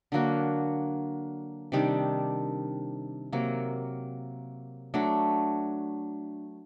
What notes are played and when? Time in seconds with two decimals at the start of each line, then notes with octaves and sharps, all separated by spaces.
0.12 D3 F#3 A#3 F#4
1.72 C3 D#3 G3 D4
3.32 C3 F#3 A#3
4.94 F#3 A3 D4